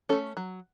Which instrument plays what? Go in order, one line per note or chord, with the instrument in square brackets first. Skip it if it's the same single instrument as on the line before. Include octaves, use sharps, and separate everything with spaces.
[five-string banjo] A3 C#4 A4
F#3